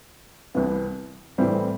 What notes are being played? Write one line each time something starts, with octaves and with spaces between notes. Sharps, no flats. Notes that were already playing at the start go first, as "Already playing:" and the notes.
C2 C3 E3 B3
A2 E3 G3 C4